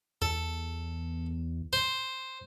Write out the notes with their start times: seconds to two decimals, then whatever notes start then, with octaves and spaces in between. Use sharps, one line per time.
0.22 E2 A4
1.73 C5